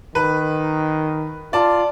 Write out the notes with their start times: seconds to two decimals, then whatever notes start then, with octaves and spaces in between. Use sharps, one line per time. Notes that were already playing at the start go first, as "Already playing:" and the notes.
0.15 D#3 B4
1.53 F4 D5 A5